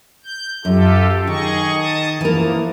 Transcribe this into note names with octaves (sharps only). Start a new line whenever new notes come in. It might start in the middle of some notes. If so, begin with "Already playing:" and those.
G6
F#2 F4 G4 A4
D#3 G#4 D#5 C#6
A5 D#6
E3 F3 A#3 A#4